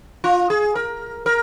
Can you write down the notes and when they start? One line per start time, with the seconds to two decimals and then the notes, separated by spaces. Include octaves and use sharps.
0.24 F4
0.50 G#4
0.75 A#4
1.26 A#4